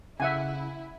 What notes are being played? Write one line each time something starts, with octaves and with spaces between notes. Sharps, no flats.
C#3 E4 E5 F#5 G#5